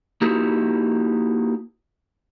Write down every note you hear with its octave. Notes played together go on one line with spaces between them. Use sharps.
A#3 D#4 E4 F#4 G4